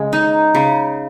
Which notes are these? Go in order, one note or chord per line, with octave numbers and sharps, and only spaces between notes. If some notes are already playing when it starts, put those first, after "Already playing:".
Already playing: C#3 G#3
D#4
C#3